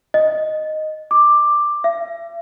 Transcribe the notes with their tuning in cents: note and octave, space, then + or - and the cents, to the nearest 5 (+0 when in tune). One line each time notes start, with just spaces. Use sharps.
D#5 -5
D6 +10
E5 +40